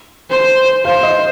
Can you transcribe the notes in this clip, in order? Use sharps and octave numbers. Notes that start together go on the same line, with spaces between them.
C5
C5 F5
D#5